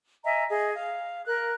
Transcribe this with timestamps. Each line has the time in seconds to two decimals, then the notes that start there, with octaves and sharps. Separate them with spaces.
0.24 D#5 E5 G#5 A#5
0.49 G#4 D#5
0.74 F5
1.27 A#4 F#6